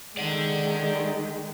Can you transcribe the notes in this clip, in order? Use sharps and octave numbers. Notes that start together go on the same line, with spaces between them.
D3 D#3 G#3 G4 D5 F#5